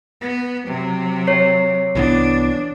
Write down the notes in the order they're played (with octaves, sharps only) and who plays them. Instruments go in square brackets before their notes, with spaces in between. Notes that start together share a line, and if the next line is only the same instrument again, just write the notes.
[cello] B3
C3 F#3
[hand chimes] C#5 C7
[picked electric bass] C2 E3 B3 [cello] D4